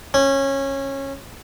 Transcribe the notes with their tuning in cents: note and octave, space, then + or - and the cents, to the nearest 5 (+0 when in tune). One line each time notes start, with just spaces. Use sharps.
C#4 -20